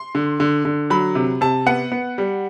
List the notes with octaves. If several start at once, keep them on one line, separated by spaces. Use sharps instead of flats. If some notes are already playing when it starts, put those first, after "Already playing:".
Already playing: C6
D3
D3
D3
F#3 B5
C3
C3 A5
B3 F#5
B3
G3